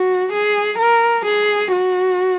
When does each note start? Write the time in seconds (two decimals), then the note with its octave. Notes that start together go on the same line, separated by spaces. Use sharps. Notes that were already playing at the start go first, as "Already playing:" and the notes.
Already playing: F#4
0.32 G#4
0.78 A#4
1.25 G#4
1.72 F#4